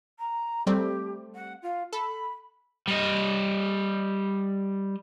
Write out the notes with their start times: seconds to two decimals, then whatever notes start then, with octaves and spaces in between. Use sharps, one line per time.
0.19 A#5
0.67 G3 A3 C4 G4
1.35 F#5
1.62 F4
1.93 A4 B5
2.88 G3 D#5